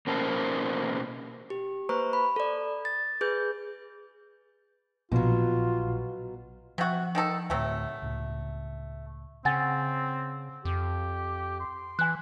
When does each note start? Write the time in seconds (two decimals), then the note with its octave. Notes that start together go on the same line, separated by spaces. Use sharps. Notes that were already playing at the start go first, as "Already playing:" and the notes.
0.07 B2 A#3 C#4 A#4 C5 A5
1.50 G4
1.89 A#3 B4 C5 A#5 C#6
2.13 B5
2.36 A4 D5
2.85 A6
3.21 G#4 B4 G6
5.12 A#1 B2 F#3 F4
6.78 C3 F3 F#4
7.15 D#3 D#4 A4
7.50 D2 A2 C3 F#3 A3
8.02 C#2 A2
9.45 C#3 C4 F#5 G#5 A6
10.65 F2 G4
11.60 C6
11.99 E3 G#5 F#6